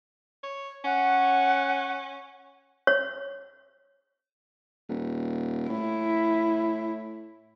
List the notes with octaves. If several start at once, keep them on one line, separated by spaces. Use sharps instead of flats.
C#5
C#4 F#5
C#5
D#1
A2 E4